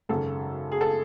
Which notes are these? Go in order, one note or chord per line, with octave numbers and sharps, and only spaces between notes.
G#1 F#2 C#3 A4
G#4
A4